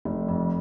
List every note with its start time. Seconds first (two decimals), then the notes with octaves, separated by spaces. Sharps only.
0.05 F1
0.28 F2